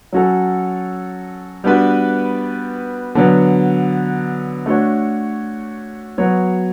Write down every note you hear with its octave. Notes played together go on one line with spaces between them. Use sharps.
F#3 C#4 F#4 A4
G3 B3 D4 F#4 B4
D3 F#3 B3
A3 D4 F#4 C#5
F#3 B3 F#4 C#5